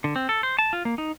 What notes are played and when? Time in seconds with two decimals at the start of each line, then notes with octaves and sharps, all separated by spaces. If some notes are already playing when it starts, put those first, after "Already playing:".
0.04 D3
0.16 C4
0.29 A4
0.43 C5
0.59 A5
0.73 F4
0.85 A#3
0.98 D#4